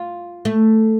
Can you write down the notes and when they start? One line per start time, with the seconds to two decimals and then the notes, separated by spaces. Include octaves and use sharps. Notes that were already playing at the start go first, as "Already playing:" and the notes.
Already playing: F4
0.45 A3